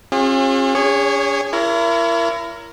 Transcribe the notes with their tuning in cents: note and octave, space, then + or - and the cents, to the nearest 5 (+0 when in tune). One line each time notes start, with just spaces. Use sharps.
C#4 -45 F4 +30 G#4 -35
C#4 +45 G#4 -30 C#5 +0
E4 +35 A#4 +0 C#5 +35